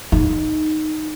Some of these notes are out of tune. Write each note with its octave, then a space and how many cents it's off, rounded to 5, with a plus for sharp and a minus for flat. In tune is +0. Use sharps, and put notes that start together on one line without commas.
D#4 -5